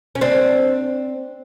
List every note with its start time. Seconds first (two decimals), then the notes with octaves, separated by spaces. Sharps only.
0.15 C#4
0.21 C4 D4